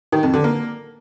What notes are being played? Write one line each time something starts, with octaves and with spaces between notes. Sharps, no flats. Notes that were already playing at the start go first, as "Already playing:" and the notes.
D#3
F2
D3
A#3